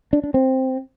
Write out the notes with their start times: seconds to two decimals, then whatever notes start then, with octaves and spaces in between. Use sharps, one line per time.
0.13 D4
0.23 D4
0.34 C4